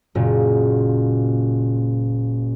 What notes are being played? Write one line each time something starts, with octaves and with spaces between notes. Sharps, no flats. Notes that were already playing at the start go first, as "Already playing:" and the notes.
F#1 A#2